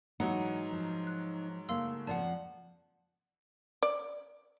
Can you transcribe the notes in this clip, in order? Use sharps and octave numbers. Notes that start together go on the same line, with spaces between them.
G#2 E3 F#3 A3 D#4 F#5
F3
F#6
C#3 A3 A#3 F5 C6 E6
F2 F3 D5 F#5 A5
D5